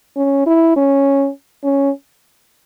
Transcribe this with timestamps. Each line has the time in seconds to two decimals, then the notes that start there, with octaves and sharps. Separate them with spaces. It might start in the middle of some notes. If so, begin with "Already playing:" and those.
0.16 C#4
0.46 E4
0.76 C#4
1.64 C#4